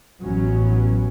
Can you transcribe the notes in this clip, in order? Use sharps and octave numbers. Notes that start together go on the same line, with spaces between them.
A1 F#3 B3 C#4